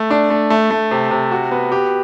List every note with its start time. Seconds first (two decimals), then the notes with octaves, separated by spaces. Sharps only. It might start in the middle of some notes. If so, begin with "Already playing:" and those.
Already playing: A3
0.11 D4
0.30 A3
0.50 A3
0.71 A3
0.91 C3
1.11 C3
1.31 F#4
1.52 B3
1.72 G4